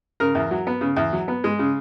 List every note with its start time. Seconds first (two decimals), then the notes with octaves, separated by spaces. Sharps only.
0.20 C#3 A#4
0.35 E2
0.51 F#3
0.67 B3
0.81 C#3
0.97 E2
1.13 F#3
1.28 B3
1.44 G#3
1.59 C#3